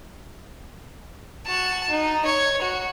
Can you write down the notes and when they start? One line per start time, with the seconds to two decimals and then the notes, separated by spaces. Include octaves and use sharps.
1.46 F#4 A5
1.90 D#4
2.25 C#5
2.61 F#4